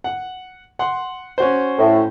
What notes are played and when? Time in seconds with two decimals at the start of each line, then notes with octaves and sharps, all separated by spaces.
0.04 F#5
0.79 F#5 C6
1.38 C#4 F#4 C5
1.79 A2